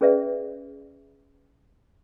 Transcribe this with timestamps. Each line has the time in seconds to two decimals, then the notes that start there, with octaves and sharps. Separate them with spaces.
0.01 C#4 G#4 B4 D5 E5